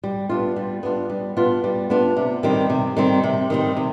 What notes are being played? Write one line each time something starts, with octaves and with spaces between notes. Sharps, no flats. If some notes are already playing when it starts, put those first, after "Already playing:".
G3
B3 D4 F4
G3
B3 D4 F4
G3
B3 D4 F4
G3
B3 D4 F4
C3
D#3 G3 C4
C3
D#3 G3 C4
C3
D#3 G3 C4
C3